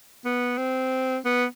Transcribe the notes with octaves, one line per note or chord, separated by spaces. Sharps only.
B3
C4
B3